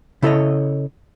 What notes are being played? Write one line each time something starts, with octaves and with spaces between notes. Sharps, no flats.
C#3 E4 A4 A#4 C#5 D#5